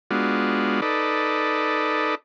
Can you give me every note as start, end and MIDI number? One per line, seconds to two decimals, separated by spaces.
0.11 0.81 56
0.11 0.81 59
0.11 0.81 62
0.11 0.81 65
0.11 0.81 66
0.82 2.15 63
0.82 2.15 69
0.82 2.15 71
0.82 2.15 74